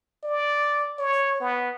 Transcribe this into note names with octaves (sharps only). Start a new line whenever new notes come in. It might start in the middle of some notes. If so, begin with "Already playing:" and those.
D5
C#5
B3